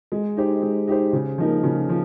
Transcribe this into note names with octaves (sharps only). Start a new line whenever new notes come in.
G#3
D#4 G4 C5
G#3
D#4 G4 C5
C#3
F3 A#3 D#4 A#4
C#3
F3